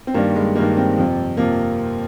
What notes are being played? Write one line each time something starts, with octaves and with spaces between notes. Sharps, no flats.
C4
G2 D#3 G3 A#3
G#3
G2 D#3 G3 A#3
C4
F2 C3 F3
C3 F3 A#3